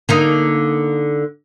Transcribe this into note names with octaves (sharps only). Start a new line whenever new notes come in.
D3 A#3 D#4